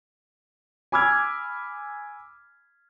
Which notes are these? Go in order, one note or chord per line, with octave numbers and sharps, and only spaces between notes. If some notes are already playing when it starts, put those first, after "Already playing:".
G#5 B5 D6 E6 F6 G#6